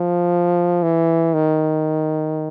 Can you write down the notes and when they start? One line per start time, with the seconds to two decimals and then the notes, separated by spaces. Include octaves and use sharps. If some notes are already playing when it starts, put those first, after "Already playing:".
Already playing: F3
0.83 E3
1.34 D#3